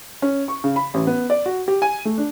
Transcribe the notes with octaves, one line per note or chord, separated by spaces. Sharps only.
C#4
C#6
C#3
B5
A1
B3
D5
F#4
G4
G#5
A3
D4